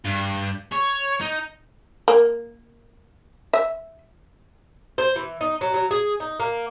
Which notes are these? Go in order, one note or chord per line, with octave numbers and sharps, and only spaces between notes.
G2
C#5
D#4
A#3
E5
C5
E3
D#4
F#3
F#3
G#4
D#4
A#3